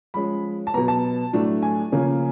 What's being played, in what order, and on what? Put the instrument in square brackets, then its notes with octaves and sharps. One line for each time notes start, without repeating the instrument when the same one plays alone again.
[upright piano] F3 G#3 C#4 B5
A5
B2 F#3 B3 A#5
A5
A2 F#3 A3 D4
G#5
C#3 F3 A#3 C#4